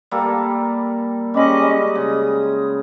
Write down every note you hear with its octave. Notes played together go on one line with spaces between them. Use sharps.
G3 A#3 A4
G3 G#3 C#4 D#5 B5 D6
C#3 D#6